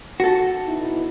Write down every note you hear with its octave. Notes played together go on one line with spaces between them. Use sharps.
F#4 A4
B2 D#4 E4